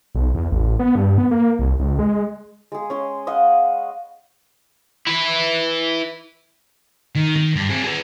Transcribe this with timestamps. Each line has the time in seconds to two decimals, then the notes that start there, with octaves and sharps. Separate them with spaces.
0.15 B1
0.34 E2
0.51 A1
0.79 B3
0.95 G2
1.18 B3
1.31 A#3
1.59 C2
1.79 C#2
1.99 G#3
2.72 G#3 G#4
2.90 C#4 C#5 C6
3.27 D#5 F5 F#5 B5
5.07 E4 B4
7.15 D#3
7.36 D#3
7.56 G2
7.69 C4 G#4
7.84 G#4 B4